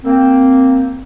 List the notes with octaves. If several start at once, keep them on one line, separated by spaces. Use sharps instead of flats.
A#3 C4